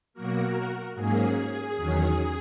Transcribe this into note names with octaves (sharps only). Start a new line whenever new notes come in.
B2 F#3 A#3 F#4 A#4
G#2 F#3 A#3 C#4 G#4
E2 D#3 F#3 C#4